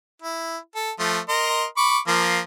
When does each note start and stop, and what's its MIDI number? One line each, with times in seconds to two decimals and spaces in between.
0.22 0.57 64
0.75 0.91 69
0.99 1.19 53
0.99 1.19 57
1.29 1.65 70
1.29 1.65 75
1.29 1.65 84
1.77 1.99 83
1.77 1.99 85
1.77 1.99 86
2.07 2.40 53
2.07 2.40 58